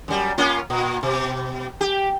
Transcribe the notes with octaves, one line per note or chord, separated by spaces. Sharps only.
F#2 G3
A#3 C#4 F4
A#2
B2
G4